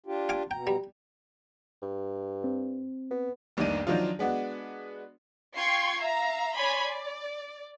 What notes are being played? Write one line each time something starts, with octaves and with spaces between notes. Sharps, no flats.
D4 F4 G4
F5 G#5 D6
B2 G5 A#5
G3
G2
C4
B3
F1 C2 D#3 A#3 D4 D#7
D#3 F3 F#3 D4 F4
G#3 B3 D4 F#4
F4 G5 C6 C#6 G#6 C7
E5 F5 A#5
C#5 D5 G#5 B5 C6
D5